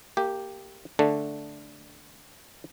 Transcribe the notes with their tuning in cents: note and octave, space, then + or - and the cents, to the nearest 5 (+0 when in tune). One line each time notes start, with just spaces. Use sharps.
A#3 -20 G4 +0
D3 +0 A3 +0 D4 +0